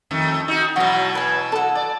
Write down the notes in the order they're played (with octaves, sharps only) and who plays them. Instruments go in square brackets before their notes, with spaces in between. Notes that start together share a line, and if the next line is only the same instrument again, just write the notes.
[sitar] F2 D#3 A3
D#4 F#4
[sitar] B2 E3 F#3 [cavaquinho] F#4 F5
[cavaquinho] B4 G#5
A4 F#5
[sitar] D5